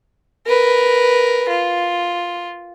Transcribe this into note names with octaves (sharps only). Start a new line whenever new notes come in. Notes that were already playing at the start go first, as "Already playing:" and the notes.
A#4 B4
F4